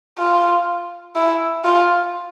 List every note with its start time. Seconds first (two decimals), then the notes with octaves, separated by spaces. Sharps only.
0.18 F4
1.15 E4
1.64 F4